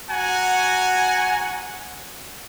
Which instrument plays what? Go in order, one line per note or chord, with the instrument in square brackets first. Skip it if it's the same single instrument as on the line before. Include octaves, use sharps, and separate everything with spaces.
[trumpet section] F#4 F#5 G#5 A#5